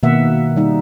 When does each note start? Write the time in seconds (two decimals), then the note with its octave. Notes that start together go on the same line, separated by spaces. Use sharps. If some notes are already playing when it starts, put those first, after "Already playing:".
0.03 B2 D#3 A#3 E5 F#5
0.56 G3 D#4